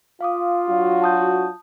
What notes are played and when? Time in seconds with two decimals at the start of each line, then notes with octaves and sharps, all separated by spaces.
0.21 F4 F5 D6 D#6
0.69 F#3 D4 F#4
1.02 A5 D#6 G6